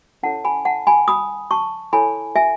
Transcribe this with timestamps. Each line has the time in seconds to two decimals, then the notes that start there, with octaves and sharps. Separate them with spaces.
0.23 C#4 E4 A4 C#5 F#5 A5
0.44 G#5 B5
0.65 F#5 A5
0.87 G#5 B5
1.08 B5 D#6
1.51 A5 C#6
1.93 E4 A4 C#5 G#5 B5
2.36 E5 G#5